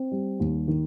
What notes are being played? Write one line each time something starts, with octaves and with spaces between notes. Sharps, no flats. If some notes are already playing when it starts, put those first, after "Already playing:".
Already playing: C4
G3
D#2
D#3